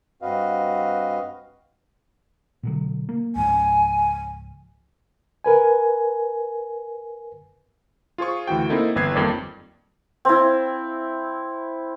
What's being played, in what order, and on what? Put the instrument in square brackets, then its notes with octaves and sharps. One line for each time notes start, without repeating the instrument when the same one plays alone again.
[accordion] G2 C4 F#4 B4 D#5 F5
[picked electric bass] B2 D3 F#3
A#3
[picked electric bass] C#2 G#2 F3 [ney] G#5
[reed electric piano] A#4 B4 G#5
[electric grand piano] F4 G#4 C5 C#6
D2 E3 F#4 G5
A#3 C4 D#4 E4 A4
G1 E2 B4 G#6 C7
F2 D#3 G3 A#3 G4 D5
[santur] C4 E4